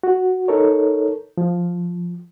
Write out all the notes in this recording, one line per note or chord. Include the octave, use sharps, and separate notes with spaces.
F#4
D#4 A4 A#4 C#5
F3